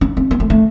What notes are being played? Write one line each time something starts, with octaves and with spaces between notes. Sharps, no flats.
C#4
C4
B3
A3
A3